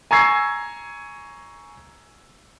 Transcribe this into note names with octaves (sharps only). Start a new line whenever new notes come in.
G#5 A#5 C#6 E6 G#6 C7